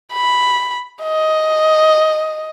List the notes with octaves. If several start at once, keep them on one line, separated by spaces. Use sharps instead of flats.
B5
D#5